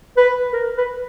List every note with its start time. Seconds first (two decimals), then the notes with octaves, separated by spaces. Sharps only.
0.17 B4
0.53 A#4
0.78 B4